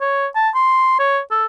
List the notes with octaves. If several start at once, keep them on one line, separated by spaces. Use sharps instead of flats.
C#5
A5
C6
C#5
A4